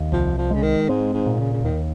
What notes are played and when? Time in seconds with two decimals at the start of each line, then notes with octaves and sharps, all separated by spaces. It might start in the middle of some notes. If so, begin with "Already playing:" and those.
Already playing: D#2
0.12 C2 F3
0.38 F3
0.51 C#3 G#3
0.63 D#3
0.89 G#2 C4
1.13 G#2
1.26 A#2
1.39 C#3
1.53 C#3
1.64 D#2 D#3